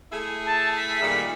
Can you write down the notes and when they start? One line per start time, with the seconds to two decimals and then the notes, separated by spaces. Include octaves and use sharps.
0.12 A3 E4 G#4
0.46 A5
0.77 B6
1.02 A#2 D#3 G3